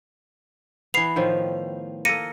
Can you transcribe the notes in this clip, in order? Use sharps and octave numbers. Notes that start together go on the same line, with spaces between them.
E3 B3 C7 F7
A2 D#3 F3
A#3 A4 A#6 C#7 D#7